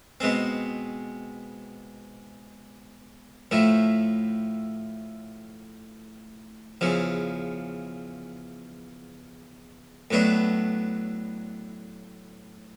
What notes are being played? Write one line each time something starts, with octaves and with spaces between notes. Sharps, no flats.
B2 G#3 C4
A2 F3 A3
E2 C#3 F3
A2 F#3 B3 D4